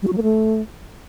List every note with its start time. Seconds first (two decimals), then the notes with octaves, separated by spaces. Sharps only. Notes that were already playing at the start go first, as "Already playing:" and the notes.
0.02 G3
0.07 F#4
0.12 F#3
0.18 A#3
0.23 A3